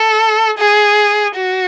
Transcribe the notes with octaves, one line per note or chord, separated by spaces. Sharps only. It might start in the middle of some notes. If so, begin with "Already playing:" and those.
Already playing: A4
G#4
F#4